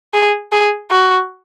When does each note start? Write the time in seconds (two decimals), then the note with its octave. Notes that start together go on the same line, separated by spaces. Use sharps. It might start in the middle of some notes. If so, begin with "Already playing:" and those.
0.14 G#4
0.52 G#4
0.90 F#4